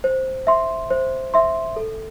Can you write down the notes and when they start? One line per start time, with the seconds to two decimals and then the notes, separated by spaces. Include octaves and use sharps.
0.04 C5
0.47 E5 C6
0.90 C5
1.34 E5 C6
1.76 A4